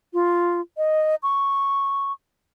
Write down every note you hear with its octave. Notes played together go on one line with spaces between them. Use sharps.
F4
D#5
C#6